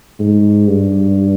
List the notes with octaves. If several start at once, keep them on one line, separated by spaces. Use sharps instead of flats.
G#2
G2